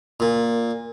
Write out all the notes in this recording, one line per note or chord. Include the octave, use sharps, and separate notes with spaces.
A#2